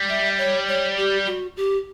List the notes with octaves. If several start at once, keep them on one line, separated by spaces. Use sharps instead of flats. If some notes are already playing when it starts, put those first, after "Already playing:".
Already playing: G3
E5
C#5
C#5
G4
F#4
G4